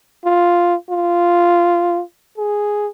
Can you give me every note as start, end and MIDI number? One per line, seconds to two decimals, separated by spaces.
0.25 0.75 65
0.90 2.02 65
2.38 2.87 68